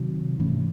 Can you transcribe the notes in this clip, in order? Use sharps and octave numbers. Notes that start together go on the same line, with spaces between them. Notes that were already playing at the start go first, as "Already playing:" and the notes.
Already playing: C3 D#3 F#3
G#2 E3 A3 C#4